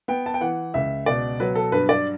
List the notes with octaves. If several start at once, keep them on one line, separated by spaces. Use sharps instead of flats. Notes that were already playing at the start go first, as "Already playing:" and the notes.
B3 G5
A5
G5
E3 F#5
C#2 E5
B2 D5
F#3 B4
A4
G2 B4
D5